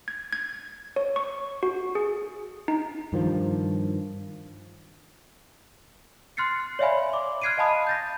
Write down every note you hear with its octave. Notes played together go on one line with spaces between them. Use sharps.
G#6
G#6
C#5
C#6
F#4
G#4
D#4
G2 D#3 F3
C6 F6 F#6 A6 C7 C#7
C#5 D5 E5 F5 G#5 B5
C6 D6
F6 F#6 G#6 C7 D7 D#7
D#5 F5 G#5 A5 B5 D#6
G6 A6 A#6